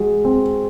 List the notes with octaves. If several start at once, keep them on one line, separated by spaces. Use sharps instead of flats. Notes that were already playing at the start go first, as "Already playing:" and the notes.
Already playing: G#3 F#4
C4